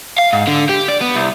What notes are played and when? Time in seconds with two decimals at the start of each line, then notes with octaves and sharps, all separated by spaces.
0.19 F5
0.33 G#2
0.48 D3
0.69 G4
0.88 D5
1.01 B3
1.15 C2